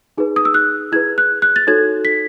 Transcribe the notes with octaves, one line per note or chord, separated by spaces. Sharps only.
D#4 G#4 B4
D#6
E6
F#6
E4 G#4 B4 G#6
F#6
F#6
A6
D#4 F#4 A4 C#5 G#6
B6